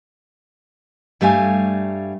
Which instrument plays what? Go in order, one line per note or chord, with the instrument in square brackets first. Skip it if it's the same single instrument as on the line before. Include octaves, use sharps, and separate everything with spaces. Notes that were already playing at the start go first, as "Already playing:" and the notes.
[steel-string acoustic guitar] G2 G3 A3 C#5 F5 G#5